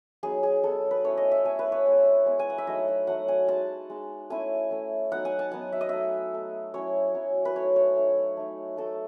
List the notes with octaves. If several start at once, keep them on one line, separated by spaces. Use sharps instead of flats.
F#3 B3 D#4 G#4
G#4
F#3 B3 D#4 A4
B4
A3 C#4 E4 C#5
D#5
E5
A3 C#4 E4 G#5
B4
C#5
G#3 B3 E4
G#3 B3 E4
G#5
F#5
E5
F#3 A3 D#4 D#5
E5
F#3 A3 D#4 F#5
G#5
G#3 D#4 A5
G#3 D#4
A3 C#4 E4 G#5
A3 C#4 E4
F#3 B3 D#4 F#5
G#5
A5
F#3 B3 D#4 G#5
E5
D#5
A3 D#4 E5
A3 D#4
F#3 C#4 E4 C#5
F#3 C#4 E4
B4
A3 D#4 C#5
C#5
A3 D#4
A3 D#4
A3 D#4 A4